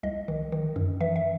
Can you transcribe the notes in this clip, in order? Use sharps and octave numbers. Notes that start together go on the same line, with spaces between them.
C2 D#5
D#3
D#3
F#2
E3 E5
E5